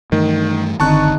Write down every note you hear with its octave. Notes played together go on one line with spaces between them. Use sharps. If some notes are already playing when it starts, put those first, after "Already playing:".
G2 D#3 E3 A3
F#1 D3 D#3 C4 D#4 A5 C#6 F#6